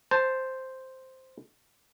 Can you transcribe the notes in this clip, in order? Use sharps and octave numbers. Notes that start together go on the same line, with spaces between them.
C5 A5